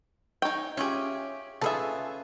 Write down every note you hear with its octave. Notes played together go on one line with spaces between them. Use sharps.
D#4 C#5 G5 G#5
C#4 F4 G4 G#4 C#5 E5
C#4 F4 G#4 A4 B4 E5 G#5 A5